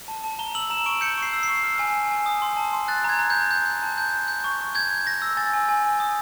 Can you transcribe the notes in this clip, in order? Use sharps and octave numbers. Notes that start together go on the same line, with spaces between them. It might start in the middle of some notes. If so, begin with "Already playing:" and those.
A5
A5
A#5 G7
E6 F#7
A#5 E7
C#6 D7
G6 C#7
C#6 C7
E6
C#6 C7
F6
G#5
G#5
G#5
D#6
C6
A5
C6
F#6 A6
A#5 G#6
A#5
A#5 G6
G6
G6
A5
G6
G6
G6
C#6
C#6
G6 G#6
G6
G6 A#6
E6
G#5 A6
G#5
G#5
G#5
D#6